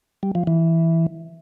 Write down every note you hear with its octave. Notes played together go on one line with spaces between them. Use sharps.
G3
F3
E3